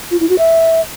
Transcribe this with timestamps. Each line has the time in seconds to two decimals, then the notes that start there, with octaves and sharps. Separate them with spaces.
0.11 F4
0.20 E4
0.29 F#4
0.38 E5